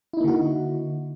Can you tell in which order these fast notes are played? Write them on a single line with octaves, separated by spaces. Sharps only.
E4 D#4 A#3 D3 F#4